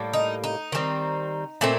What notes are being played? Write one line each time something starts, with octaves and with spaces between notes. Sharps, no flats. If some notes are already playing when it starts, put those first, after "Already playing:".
Already playing: A2 G3 A#3
D#4
D#4
D#3 G3 C4
A#2 A3 C4